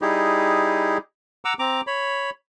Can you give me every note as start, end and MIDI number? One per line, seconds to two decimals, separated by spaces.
0.02 0.98 55
0.02 0.98 63
0.02 0.98 64
0.02 0.98 67
0.02 0.98 68
1.45 1.54 78
1.45 1.54 82
1.45 1.54 86
1.45 1.54 88
1.59 1.81 60
1.59 1.81 82
1.59 1.81 86
1.87 2.30 73
1.87 2.30 83